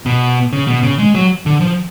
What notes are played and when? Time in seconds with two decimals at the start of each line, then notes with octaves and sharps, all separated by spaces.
0.06 B2
0.53 C#3
0.67 B2
0.83 C#3
0.99 G#3
1.15 F#3
1.46 D3
1.61 F3